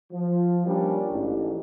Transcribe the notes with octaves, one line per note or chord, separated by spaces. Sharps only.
F3
F3 G3 A#3 C#4 D4
A1 G#2